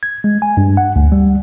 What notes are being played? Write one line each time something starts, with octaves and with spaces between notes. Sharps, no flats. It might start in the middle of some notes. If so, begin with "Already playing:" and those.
G#6
G#3
G#5
G2
F#5
D2
G3